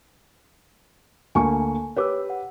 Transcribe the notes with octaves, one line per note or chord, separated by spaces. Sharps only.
D2 A#3 G#5 A5 C#6
G4 B4 C#5 D6 E6
F#5